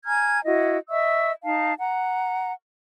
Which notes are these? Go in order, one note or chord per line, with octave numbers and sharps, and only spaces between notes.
G#5 A#5 F6 G#6
E4 F#4 D#5
D#5 E5 C#6 E6
D#4 F5 A5
F#5 A#5